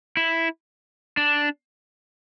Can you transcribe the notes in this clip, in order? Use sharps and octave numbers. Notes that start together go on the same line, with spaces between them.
E4
D4